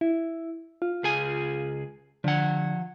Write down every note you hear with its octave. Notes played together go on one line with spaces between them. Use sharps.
E4
F4
C#2 G#4 G#5
D3 F3 F#5